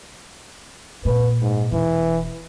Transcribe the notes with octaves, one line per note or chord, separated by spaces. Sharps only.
A#2 B4
G#2
E1 E3